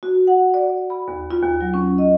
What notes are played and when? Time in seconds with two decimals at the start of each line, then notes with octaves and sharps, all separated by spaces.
0.03 F#4
0.27 F#5
0.54 D5
0.90 B5
1.08 D#2
1.31 F4
1.43 D#2
1.61 F#3
1.74 C#4
1.98 D#5